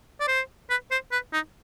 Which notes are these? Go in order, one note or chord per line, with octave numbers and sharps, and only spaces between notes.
D5
C5
B4
C5
B4
D#4